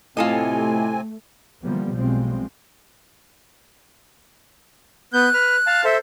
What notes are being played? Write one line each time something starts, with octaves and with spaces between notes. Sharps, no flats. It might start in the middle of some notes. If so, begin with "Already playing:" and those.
A2 C3 A3 C4 F4 A4 D#5 G#5
D3 E3 F3 G3 A#3 B3
B1 B2 F3 G3 G#3 C4
B3 F#6 G6
B4 F6
F5 A5
A4 C5 E5